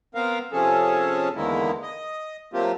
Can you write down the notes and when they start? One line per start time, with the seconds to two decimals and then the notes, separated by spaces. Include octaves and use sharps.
0.15 B3 C4 A#4 F5
0.52 C3 F3 C#4 G#4 A4
1.35 E2 D3 D#3 G#3 A#3 E4
1.82 D#5
2.54 F#3 A3 A#3 C4 F4 G4